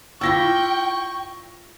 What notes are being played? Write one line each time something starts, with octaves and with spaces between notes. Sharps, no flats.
E4 F4 D5 G5 C#6 E6 A#6